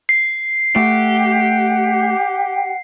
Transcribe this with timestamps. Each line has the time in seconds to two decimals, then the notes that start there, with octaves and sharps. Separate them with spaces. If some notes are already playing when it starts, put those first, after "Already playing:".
0.09 C7
0.76 A3 G4 F#5